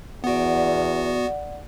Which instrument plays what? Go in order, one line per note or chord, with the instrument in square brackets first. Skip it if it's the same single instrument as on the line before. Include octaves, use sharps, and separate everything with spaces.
[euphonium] E2 [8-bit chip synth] B3 F#4 [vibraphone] D5 F#5